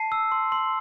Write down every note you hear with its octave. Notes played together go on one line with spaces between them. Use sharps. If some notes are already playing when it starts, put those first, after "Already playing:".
Already playing: A5 C7
E6
C6
C6